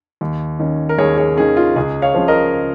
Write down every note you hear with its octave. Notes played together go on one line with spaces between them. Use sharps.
D#2
D#3 C#4
A#4
D#2 G#4 C#5
G#4 C#5
D#3 C#4 G#4
F4
C#2 G#4
C#5 F5
C#3 F3
A#4 D#5